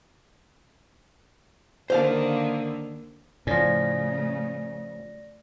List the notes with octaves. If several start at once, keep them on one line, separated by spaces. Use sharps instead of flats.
D3 D#3 A#3 C5 F5 A5
A2 C#3 F3 A3 C#4 D5 A#6